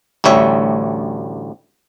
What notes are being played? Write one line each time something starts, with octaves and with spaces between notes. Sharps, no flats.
A1 D2 G3 C#5 E5